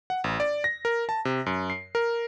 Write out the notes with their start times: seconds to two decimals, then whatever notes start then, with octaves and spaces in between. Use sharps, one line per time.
0.10 F#5
0.24 A1
0.40 D5
0.64 A#6
0.85 A#4
1.09 A5
1.25 C3
1.46 F#2
1.70 C7
1.95 A#4